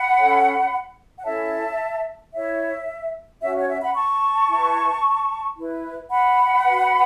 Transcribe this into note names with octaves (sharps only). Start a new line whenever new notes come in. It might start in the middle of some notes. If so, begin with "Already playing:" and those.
Already playing: F#5 B5
C#4 A4 C#5
F#5
C#4 E4 A4 C#5 E5 A5
E4 C#5 E5
C#4 F#4 C#5 E5
C#5
E5
F#5 B5
A5 C#6
E4
B4
E4 B4
F#5 B5
F#4 B4